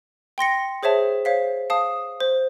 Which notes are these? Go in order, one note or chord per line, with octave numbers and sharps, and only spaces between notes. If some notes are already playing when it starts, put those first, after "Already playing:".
G5 C6 A#6 C#7
G#4 C5 C#5 E5 A5
C5 C#5 F5 B6
F5 A5 D#6
C5